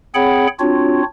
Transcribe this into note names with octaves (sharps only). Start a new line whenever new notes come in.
C4 G#4 C#5 F#5 G5 B5
C4 D4 F4 F#4 C#5